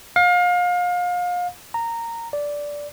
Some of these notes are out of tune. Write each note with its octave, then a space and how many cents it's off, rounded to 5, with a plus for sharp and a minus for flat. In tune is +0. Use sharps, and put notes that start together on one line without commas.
F5 +30
A#5 -15
D5 -10